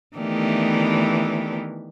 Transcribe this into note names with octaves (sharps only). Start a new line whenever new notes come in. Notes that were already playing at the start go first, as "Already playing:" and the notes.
D#3 E3 A3 B3 D4 G4